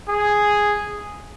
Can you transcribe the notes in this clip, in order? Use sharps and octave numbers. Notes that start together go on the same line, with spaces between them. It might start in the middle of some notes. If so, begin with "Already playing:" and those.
G#4